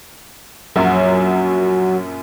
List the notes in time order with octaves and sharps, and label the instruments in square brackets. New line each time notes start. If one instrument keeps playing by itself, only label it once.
[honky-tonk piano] A#1 F#2 [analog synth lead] F#3